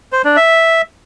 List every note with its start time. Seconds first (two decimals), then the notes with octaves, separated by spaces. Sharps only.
0.13 C5
0.25 D4
0.37 E5